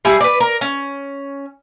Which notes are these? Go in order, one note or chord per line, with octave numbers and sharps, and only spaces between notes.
G3 E4 G#4
B4 D5
A#4
C#4